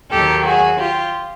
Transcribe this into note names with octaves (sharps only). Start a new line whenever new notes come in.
D#2 D#3 F#3 G4 A4
F#4 G#4
F4 G4